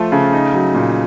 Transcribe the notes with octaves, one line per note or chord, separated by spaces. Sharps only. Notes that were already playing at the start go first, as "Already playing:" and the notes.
Already playing: F3 A3 F4
C#3
D#4
F#3
A#2